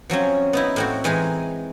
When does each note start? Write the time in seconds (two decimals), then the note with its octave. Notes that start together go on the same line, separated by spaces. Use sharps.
0.10 F3 F#3 C4 C#4
0.53 B3 D#4 E4
0.76 A2 C4 F#4
1.04 E3 G#3 D#4 G#4